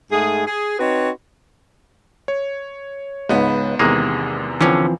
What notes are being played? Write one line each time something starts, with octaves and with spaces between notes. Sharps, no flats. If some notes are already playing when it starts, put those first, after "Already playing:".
G#2 A3 G#4
G#4
C4 D#4 F#4 B4 C#5
C#5
C#2 G#2 B3
E2 C3 D#3 G#3 A#3
D3 E3 F3 C4 C#4